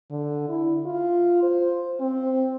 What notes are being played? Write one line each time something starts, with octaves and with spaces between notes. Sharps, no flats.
D3
E4
F4
C5
C4